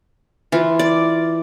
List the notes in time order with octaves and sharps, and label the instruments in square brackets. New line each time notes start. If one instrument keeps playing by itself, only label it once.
[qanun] E3 F4
D5